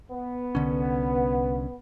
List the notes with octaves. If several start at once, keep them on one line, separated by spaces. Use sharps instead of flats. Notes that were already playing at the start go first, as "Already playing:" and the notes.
B3
C2 D3 C#4